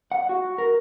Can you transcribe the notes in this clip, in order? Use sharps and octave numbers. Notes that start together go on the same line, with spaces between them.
F#5
F#4
A#4